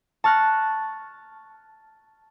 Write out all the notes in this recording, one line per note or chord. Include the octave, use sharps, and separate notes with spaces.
A5 C#6 F6 F#6 A#6